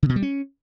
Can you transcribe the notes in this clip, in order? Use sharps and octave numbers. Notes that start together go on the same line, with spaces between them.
D3
B2
G3
C#4